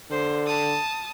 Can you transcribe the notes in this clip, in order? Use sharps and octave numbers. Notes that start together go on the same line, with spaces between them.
D3 C5
A5 D#6